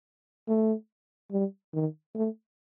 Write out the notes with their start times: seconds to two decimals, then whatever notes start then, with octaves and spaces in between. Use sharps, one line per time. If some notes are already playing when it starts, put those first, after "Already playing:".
0.48 A3
1.32 G3
1.73 D#3
2.15 A3